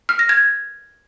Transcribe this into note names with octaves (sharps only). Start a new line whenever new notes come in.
F6
A#6
G#6